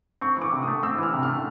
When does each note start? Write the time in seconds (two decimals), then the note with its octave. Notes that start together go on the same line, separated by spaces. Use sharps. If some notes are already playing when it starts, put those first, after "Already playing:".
0.21 C4 C#6
0.37 E3 D6
0.52 C3
0.62 D#6
0.68 A3
0.83 C4 E6
0.98 E3 F6
1.13 C3
1.23 F6
1.28 A3